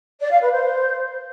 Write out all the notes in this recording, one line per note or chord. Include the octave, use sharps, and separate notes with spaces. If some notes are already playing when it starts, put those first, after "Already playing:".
D5
F5
B4
C5